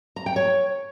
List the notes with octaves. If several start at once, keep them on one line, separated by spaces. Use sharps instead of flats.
A#5
G5
C#5